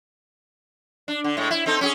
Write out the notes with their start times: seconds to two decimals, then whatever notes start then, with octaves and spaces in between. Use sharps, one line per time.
1.08 D4
1.24 D3
1.37 A2 G#3
1.51 E4
1.66 C4 D#4 A4
1.81 C#4 G4 G#4